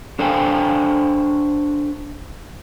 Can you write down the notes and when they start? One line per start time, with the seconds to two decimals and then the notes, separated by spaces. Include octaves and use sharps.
0.19 D4 A4 C5 F5 G5 G#5